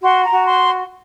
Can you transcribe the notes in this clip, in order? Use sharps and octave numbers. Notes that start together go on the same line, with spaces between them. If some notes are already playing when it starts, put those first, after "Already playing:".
F#4 C6
A#5
F#4
C6